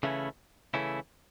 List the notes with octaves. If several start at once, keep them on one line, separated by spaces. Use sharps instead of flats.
C#3 E3 A3 C#4 E4
C#3 E3 A3 C#4 E4